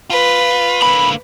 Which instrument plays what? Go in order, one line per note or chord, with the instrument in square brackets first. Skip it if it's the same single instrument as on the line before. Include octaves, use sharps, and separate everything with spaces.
[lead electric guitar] F4 [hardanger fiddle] B4
[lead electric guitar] D3 A#3 [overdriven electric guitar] B5